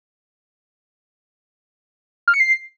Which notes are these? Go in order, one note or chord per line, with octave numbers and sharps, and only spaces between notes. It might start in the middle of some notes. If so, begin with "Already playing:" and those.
F6
C#7
C7